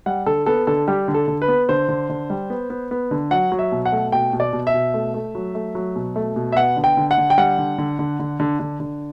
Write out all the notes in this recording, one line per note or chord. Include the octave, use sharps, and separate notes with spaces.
G3 F#5
D3 A4
B3 A4
D3 A4
G3 G4
D3
A4
D3
B4
B3
D3 C5
D3
D3
G3
B3
B3
B3
D3
F#3 F#5
F#3
E5
B2
F#5
A3
B2 G5
B2
D5
B2
E5
B2
A3
A3
F#3
A3
F#3
B2
A3
B2
E5
B3 F#5
D3
G5
D3
F#5
D3
G5
G3 F#5
D3
D3
D3
D3
D3
D3
D3